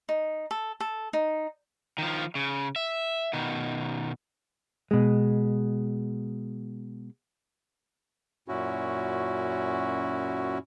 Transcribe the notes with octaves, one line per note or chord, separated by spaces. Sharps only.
D#4
A4
A4
D#4
D#3 F3
C#3
E5
B2 D#3
B2 G#3
F#2 A#2 C#4 E4 F#4